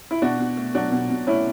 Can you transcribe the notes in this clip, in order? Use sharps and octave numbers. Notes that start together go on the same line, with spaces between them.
E4
B2 D4 F#4
B2
A3
F#3 D4 F#4
B2
B2
A3 C#4 E4